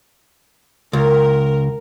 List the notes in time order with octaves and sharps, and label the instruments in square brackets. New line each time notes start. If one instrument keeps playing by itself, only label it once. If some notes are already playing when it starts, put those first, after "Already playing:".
[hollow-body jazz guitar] C#2 [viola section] A#4